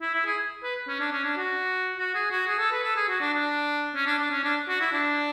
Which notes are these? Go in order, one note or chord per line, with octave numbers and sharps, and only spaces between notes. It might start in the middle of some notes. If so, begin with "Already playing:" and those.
E4
E4
G#4
B4
C#4
D4
C#4
D4
F#4
F#4
G#4
F#4
G#4
A4
B4
A4
G#4
F#4
D4
D4
C#4
D4
D4
C#4
D4
F#4
E4
D4